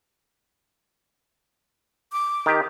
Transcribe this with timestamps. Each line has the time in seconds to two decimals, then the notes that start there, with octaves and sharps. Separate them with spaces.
2.12 D6
2.46 D#3 G4